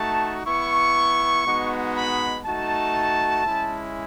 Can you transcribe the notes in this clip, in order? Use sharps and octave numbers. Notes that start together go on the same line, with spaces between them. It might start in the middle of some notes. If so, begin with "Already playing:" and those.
Already playing: A3 D#4 F#4 A5
B3 E4 C#6
G#3 B3 D#4 F#4
B5
A3 D#4 F#4 A5
G#3 C#4 E4